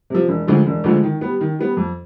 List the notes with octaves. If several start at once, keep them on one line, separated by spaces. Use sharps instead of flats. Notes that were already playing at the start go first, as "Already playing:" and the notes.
C3 F3
E1
D2 D3 F3 G#3
E1
D2 D3 F3 G#3
D#3
B3
G3
D#3
G3 B3
F2